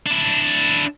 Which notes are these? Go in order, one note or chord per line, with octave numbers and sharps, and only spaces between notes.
D4 E4